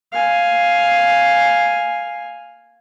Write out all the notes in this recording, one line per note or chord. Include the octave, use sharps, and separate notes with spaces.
F5 G#5